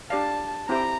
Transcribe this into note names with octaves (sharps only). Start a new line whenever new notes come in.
D4 G4 D5 F5 A5
C4 E4 G4 C5 G5 A#5